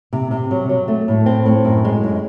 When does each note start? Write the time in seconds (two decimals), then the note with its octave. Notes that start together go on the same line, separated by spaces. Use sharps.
0.13 C3
0.31 C3
0.51 F#3
0.69 F#3
0.88 A3
1.08 A2
1.26 C4
1.46 A2
1.65 F#2
1.85 G#3
2.04 F#2